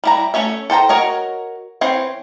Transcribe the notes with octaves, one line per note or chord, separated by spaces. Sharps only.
G3 E4 A#5
A3 A#3 C#4 C#5 E5
A4 C5 G5 A#5
F#4 A#4 C#5 D#5
E3 C4 C5 C#5